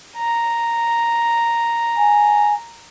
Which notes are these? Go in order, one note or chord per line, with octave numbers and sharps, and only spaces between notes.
A#5
G#5